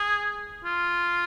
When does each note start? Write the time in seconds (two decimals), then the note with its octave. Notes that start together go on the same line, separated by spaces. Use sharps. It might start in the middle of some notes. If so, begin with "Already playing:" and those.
Already playing: G#4
0.64 F4